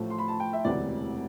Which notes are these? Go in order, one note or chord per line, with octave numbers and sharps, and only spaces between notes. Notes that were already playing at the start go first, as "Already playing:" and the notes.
Already playing: A1 A2 F3 A3
C6
B5
A5
G5
E5
E1 D2 C3 E3 D5